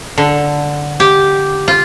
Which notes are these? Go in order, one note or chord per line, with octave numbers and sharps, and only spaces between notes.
D3
G4
F4